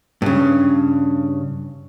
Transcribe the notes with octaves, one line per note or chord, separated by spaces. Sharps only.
G2 C#3